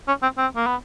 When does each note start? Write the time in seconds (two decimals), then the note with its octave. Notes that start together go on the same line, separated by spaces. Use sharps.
0.08 C#4
0.23 C4
0.38 C4
0.56 A#3
0.67 B3